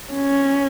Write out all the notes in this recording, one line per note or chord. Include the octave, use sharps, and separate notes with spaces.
C#4